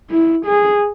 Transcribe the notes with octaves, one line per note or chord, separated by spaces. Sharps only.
E4
G#4